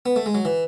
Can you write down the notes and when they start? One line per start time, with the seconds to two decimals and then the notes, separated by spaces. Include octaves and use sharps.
0.06 B3
0.16 A3
0.26 G#3
0.34 F#3
0.45 E3